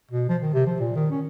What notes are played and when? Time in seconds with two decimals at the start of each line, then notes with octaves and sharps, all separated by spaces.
0.11 B2
0.29 F3
0.42 D#3
0.54 C3
0.67 F3
0.80 A#2
0.96 D#3
1.11 C#4